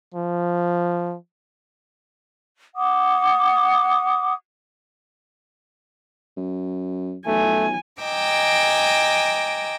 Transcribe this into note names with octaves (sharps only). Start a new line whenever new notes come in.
F3
F#5 D6 D#6
F#2
B1 A3 G#5
D#5 G5 G#5 A#5 D6 E6